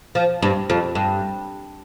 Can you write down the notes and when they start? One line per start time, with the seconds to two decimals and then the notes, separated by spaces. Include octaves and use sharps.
0.15 F3
0.42 G2
0.70 F2
0.95 G2